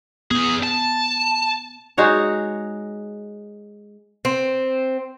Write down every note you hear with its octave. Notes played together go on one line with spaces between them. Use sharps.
E2 B3 G#4
A5
G#3 D#4 F#4 C#5
C4